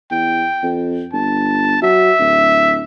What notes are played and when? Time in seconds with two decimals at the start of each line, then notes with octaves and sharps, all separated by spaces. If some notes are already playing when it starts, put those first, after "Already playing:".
0.11 E2 G5
0.63 F2
1.13 G1 A5
1.82 F#3 E5
2.19 D1